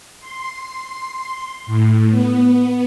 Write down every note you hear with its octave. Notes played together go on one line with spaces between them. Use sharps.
C6
A2
B3